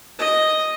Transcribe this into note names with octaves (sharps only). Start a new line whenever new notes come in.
D#5